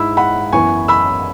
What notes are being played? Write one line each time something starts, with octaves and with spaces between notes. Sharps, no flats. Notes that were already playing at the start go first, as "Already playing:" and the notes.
Already playing: G#2 G#3 E4 B5 E6
F#5 B5
F#2 E3 B3 E4 G#5 C#6
B5 E6